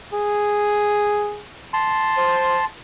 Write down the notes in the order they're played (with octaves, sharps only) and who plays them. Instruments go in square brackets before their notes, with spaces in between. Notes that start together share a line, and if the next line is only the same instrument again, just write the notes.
[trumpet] G#4
[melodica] A5 C6
[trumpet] C5